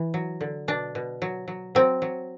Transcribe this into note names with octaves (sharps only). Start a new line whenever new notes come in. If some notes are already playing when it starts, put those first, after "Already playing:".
Already playing: E3
F#3
D3
B2 D4
B2
F#3
F#3
F#3 C4
F#3